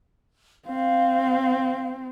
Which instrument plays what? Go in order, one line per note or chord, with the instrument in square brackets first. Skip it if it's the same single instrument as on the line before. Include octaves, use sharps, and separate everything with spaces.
[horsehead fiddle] C4 [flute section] F5